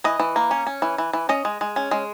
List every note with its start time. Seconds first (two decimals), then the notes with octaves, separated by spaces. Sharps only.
0.04 E3 D#5
0.19 E3
0.36 A#3
0.51 C#4
0.67 C#4
0.82 E3
0.98 E3
1.13 E3
1.29 C#4 D#5
1.45 G#3
1.61 G#3
1.76 C#4
1.91 G#3